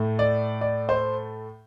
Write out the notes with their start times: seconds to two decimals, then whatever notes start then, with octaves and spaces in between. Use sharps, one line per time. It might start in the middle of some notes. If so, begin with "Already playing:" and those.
Already playing: A2 A3
0.19 D5
0.61 D5
0.89 C5